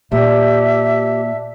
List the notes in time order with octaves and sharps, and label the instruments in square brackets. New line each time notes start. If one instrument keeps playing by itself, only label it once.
[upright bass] A#2 [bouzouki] D4 [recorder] G4 [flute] E5